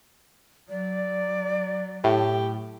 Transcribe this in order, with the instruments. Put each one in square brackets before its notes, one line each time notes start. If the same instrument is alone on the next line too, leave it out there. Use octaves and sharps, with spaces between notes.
[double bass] F#3 [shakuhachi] D5
[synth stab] A2 [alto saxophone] G4